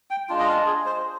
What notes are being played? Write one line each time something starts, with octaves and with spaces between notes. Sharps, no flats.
G5
G#3 D4 F4
D#5
F5
G#4
C5